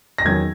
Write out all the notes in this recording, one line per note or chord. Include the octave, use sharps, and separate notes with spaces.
A#6
E2 D#3 F#3 G#6